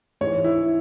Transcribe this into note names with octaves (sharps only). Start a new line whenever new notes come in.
G#2 E3 G#3 C#5
E4